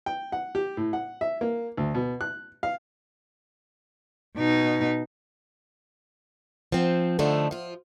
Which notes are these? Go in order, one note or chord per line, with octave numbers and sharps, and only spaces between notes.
G5
F#5
G4
A2
F#5
E5
A#3
D2
B2
F#6
F5
B2 D#4
F3 C4
D3 F3 A3 D#4
F3 F4